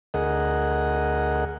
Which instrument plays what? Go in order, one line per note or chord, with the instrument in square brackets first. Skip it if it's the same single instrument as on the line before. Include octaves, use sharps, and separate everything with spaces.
[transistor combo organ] D2 G#4 A#4 D#5 F#5